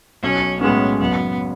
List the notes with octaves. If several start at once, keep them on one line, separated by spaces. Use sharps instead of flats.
B1 C#4
A2 G#3 B3 C#4
F#1 B3